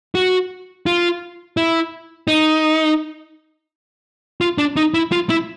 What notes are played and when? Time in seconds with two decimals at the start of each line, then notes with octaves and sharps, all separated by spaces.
0.15 F#4
0.86 F4
1.57 E4
2.28 D#4
4.41 F4
4.58 D4
4.77 D#4
4.94 E4
5.12 F4
5.30 E4